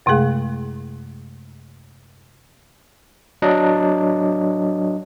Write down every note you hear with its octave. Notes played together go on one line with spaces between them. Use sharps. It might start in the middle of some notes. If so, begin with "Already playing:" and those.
F#2 C3 G#3 A3 G#4 F5
F#3 D4 D#5